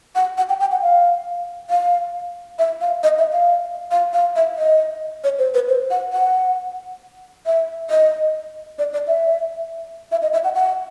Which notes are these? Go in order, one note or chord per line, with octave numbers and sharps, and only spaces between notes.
F#5
F#5
G5
G5
F#5
F5
F5
E5
F5
D#5
E5
F5
F5
F5
E5
D#5
C#5
C5
B4
C5
F#5
F#5
E5
D#5
D5
D5
E5
E5
D#5
E5
F#5
F#5